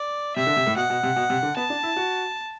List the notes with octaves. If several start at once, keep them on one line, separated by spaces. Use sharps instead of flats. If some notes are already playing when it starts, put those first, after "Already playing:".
Already playing: D5
C3 E5
D3
C3
A2
B2 F#5
B2
C3
B2
C3
D3
B3 A5
D4
E4
F#4